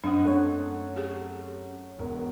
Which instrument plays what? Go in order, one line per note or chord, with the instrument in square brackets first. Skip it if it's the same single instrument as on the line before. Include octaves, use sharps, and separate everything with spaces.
[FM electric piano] F#2 D#6 [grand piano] C4 D#5 F#5 [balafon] D4
[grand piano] F#2 A3 C4 [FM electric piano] C#5 F#5
[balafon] G4 G#4
[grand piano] E1 B2 A#4